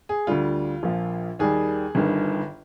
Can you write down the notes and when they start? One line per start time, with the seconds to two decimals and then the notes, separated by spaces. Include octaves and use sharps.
0.09 G#4
0.27 D2 D3 G3 F4
0.83 A#1 A#2 F3
1.39 D#2 D#3 G3 G#4
1.95 G1 G2 D#3